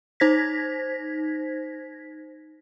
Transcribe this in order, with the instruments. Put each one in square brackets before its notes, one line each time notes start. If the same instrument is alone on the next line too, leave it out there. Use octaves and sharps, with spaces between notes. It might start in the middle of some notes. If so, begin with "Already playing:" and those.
[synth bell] D#4 C5 G#6 A#6 B6